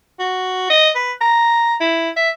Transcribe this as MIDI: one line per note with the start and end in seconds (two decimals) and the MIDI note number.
0.19 0.66 66
0.70 0.90 75
0.95 1.12 71
1.21 1.75 82
1.80 2.10 64
2.16 2.30 76